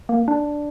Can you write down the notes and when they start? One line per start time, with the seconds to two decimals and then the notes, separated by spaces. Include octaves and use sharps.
0.09 A#3
0.28 D4